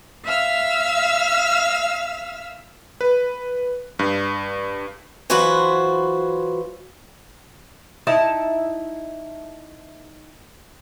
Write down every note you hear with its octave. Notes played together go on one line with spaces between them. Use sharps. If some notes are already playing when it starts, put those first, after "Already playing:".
E5 F5 E6 F6
B4
G2
E3 F#3 F4 F#4 B4 C5
D#4 E4 A5